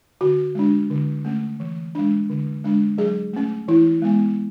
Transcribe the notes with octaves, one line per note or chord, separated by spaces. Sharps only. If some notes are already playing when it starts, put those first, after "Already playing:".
D3 F#4
G#3 D4
D3
A3 C#4
E3
G#3 D4
D3
G#3 D4
F#3 G#4
A3 C#4
E3 E4
G#3 B3